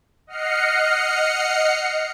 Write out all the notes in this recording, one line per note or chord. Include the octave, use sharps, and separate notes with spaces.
D#5 F#5 F6 C7 C#7